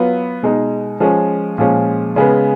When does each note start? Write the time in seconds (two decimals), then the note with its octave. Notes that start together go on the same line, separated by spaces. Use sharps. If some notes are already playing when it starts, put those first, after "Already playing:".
Already playing: F#3 B3 F4
0.43 B2 G#3 D#4
1.00 F3 G#3 C#4
1.58 A#2 F3 G#3 C#4
2.16 C#3 G#3 B3